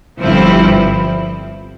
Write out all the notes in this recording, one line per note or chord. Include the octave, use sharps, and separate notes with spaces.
G1 G2 F3 C4 E4